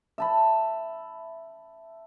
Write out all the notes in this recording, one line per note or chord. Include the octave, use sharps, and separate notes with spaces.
E5 A5 B5